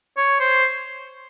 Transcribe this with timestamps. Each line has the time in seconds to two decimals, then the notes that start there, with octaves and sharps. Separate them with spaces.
0.17 C#5
0.40 C5